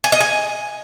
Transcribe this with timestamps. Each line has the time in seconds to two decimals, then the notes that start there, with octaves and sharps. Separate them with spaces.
0.04 G#5
0.12 D#5
0.20 G#5